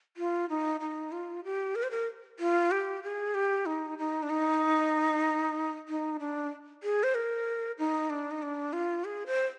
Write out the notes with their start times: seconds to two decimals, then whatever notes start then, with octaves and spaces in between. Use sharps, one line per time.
0.17 F4
0.50 D#4
0.80 D#4
1.12 F4
1.44 G4
1.75 A#4
1.83 C5
1.91 A#4
2.39 F4
2.71 G4
3.03 G#4
3.35 G4
3.66 D#4
3.99 D#4
4.23 D4
4.30 D#4
5.89 D#4
6.20 D4
6.83 G#4
7.03 C5
7.15 A#4
7.78 D#4
8.10 D4
8.31 D#4
8.42 D4
8.73 F4
9.05 G#4
9.26 C5